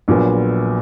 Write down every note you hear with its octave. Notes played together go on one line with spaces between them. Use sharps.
A#1 A#2 F#3 B3